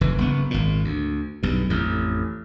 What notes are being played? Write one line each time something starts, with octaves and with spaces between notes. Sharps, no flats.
F1 E3
F#1 B3
G#1 A#2
D2
B1 G2
A1 F2